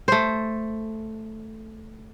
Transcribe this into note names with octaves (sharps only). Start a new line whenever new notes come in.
A3 C5